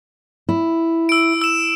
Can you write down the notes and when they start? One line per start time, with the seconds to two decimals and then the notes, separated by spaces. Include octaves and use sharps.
0.49 E4
1.09 E6 D7
1.42 E6 E7